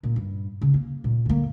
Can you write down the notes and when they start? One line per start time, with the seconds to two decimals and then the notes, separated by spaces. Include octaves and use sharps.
0.03 A#2
0.16 G2
0.61 C#3
0.74 A#3
1.04 A#2
1.25 D3 A#3